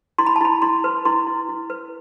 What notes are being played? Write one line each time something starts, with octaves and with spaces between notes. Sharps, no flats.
E4 C6
B5
A5
E4 B5
E4 C6
B4
E4 C6
E4
E4
B4